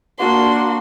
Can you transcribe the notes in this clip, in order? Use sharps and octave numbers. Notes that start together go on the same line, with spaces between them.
A#3 D4 F#4 C6